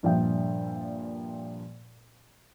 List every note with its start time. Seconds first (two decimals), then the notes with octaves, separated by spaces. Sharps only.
0.03 G2 A#2 F3 E5 G5